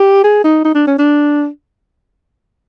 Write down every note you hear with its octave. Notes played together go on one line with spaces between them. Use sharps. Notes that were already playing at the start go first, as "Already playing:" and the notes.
Already playing: G4
G#4
D#4
D#4
D4
C#4
D4